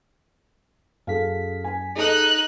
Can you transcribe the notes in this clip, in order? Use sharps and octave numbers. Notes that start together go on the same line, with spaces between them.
F#2 G#4 A4 F5 B6
G#5
D#4 G#4 A4 D#5 F#6